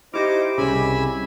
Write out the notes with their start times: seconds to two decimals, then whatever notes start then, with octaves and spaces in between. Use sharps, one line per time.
0.14 D#4 E4 G4 C5 D6 A#6
0.58 C2 C#3 G#5 B5 E6